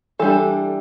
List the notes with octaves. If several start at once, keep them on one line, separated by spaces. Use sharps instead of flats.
E3 G3 D4 A4